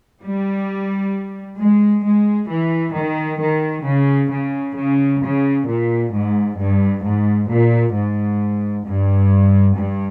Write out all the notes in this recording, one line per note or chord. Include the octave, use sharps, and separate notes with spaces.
G3
G#3
G#3
E3
D#3
D#3
C#3
C#3
C#3
C#3
A#2
G#2
G2
G#2
A#2
G#2
G2
G2